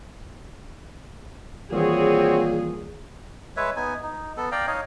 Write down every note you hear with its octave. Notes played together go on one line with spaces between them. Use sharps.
A#2 D#3 E3 G3 C4 F#4 G#4 C#5
G#3 B4 C#5 E5
B3 D#4 G#5
D#4
B3 A4
D5 F5 G5 A#5
D#4 C#5 D#5 F5